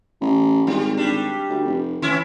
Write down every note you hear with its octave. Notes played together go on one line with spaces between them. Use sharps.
A1
G#1 G3
G3 D4
D2
F1
E3 C#4 E4